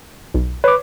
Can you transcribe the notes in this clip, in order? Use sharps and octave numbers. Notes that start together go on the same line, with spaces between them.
B1
B4 C#5 D6